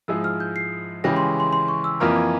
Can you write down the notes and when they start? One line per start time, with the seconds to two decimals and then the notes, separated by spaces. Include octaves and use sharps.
0.08 G#2 F3 G#3 E4 G#4 E6
0.24 F6
0.40 G6
0.56 C7
1.04 C#3 E3 G#3 C#4 G4 A#6
1.17 C6
1.40 C6
1.53 C6
1.68 C#6
1.84 E6
2.00 F2 E3 A#3 F4 A#4 F6
2.16 G#6